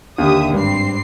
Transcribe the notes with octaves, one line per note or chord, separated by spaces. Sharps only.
D#2 D3 G4 E5 D#6
G#1 G2 C4 C7